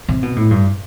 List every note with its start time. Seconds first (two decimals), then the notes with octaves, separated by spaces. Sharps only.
0.09 C3
0.23 B2
0.36 A2
0.51 G2